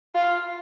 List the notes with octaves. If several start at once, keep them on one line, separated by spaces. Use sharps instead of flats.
F4